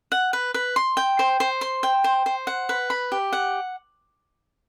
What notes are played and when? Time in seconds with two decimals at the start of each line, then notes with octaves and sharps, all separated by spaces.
0.12 F#5
0.33 B4
0.54 B4
0.76 C6
0.97 G5
1.19 C5
1.40 C5
1.61 C6
1.83 G5
2.04 C5
2.26 C5
2.47 F#5
2.69 B4
2.90 B5
3.12 G4
3.33 F#5